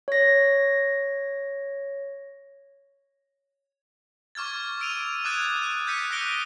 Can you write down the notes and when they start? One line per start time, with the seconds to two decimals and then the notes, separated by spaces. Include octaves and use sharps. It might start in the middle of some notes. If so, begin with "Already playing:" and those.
0.08 C#5 A#6
4.35 C#6 D6 F6 G#6 A6
4.80 E6 D7 D#7 F7
5.25 D6 D#6 F#6 G#6 A6 E7
5.62 F#6
5.87 G6 A6 B6 C#7 D#7
6.11 D#6 F#6 A#6 C#7 D7 G7